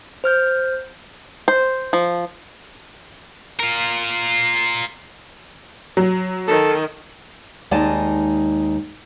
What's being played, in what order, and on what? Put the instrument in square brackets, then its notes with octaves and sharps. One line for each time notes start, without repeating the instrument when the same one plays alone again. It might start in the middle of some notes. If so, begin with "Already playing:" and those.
[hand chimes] C5 F6 G6
[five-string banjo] C5
F3
[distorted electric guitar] F4 A#4
[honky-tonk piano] F#3
[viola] D#3 [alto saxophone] A4
[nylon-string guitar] D#2 G#3 D#4 D5 G#5 A5